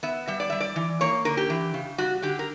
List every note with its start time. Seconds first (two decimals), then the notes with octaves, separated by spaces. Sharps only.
0.03 B3 E5
0.27 G3 E5
0.40 D5
0.50 G3 E5
0.60 D5
0.76 E3
1.01 A#3 C#5
1.25 D3 A#4
1.37 G4
1.50 E3
1.74 C#3
1.98 G3 F#4
2.22 D3 G4
2.39 A#4